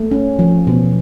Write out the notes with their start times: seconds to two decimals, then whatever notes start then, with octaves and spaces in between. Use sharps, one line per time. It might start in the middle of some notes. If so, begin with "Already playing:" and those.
Already playing: A3
0.11 C#4
0.39 F3
0.67 B2